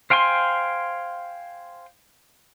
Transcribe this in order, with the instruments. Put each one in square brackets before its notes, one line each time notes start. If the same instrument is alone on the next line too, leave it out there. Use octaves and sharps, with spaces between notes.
[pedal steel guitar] C5 F5 G5 G#5 C6